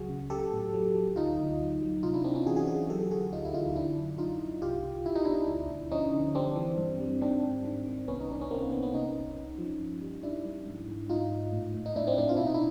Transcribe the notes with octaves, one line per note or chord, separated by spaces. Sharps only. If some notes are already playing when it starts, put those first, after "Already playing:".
Already playing: C#2 F#3 F#4 G#4
C#3
F#3 G4 A4
A2
F#3
F#3
D2 D#4 F4
D2
F#3
F#3
C3 D#4 F4
D4 E4
C3 C4 D4
C#4 D#4
E3 F#4 G#4
F#4 G#4
E3 F#4 G#4
F#3 G4 A4
A4
D3 F#4 G#4
D2 D#4 F4
E4
D2 D#4 F4
D3 D4 E4
F#2
F#2 D#4 F4
F#2
C2 F4 G4
C2
C2 E4
D#4
B2 D4 E4
D2
D2
F3 C#4 D#4
D3
G3 C4 D4
E3
G2
G3
D#3 C4 D4
G#2
D#3
D#3
C2 B3 C#4
D#4
C2 D4
C#4
C2 A#3 C4
B3
C2 B3
B3 C#4
C3 C#4 D#4
C2
C2
F3
G2
G3
G3 D4 E4
G3
G#2
G#2
G#2 D#4 F4
G#2
A2
A2
D#4
A2 D4 E4
C4 D4
A2 C4 D4
F4
B2 E4
D#4
D4 E4